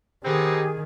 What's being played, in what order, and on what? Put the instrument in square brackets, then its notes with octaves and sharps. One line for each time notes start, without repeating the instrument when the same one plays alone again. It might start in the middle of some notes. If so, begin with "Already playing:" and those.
[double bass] D#3 [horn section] B3 C4 D#4 [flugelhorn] G4 [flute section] G#4